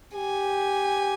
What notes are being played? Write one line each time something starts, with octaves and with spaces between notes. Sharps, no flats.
G4 G#5